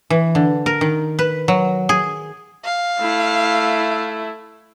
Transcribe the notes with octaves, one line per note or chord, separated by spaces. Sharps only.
E3
D3
A#4
D#3
B4
F#3
G#4
F5
A3 E4